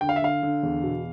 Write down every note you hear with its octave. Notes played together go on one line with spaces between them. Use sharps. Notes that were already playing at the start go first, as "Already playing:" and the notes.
D3 G5
F5
E5
D3 F5
D3
E2
B2